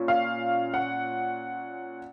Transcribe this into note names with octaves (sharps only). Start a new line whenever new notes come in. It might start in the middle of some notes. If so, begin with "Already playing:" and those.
Already playing: A#2 C#4
F5
F#5